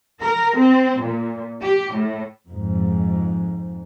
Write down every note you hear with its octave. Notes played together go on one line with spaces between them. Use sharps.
A#4
C4
A#2
G4
A2
F2 G#2